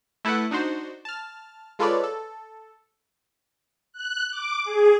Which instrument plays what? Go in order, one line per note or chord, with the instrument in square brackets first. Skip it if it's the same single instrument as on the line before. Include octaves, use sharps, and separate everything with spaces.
[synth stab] A3 E4 A4 B4 F#5
D4 D#4 F#4 C5
A5 F6
G#3 F4 A4 B4 C#5 D5
A4
[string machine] F#6
D6
G#4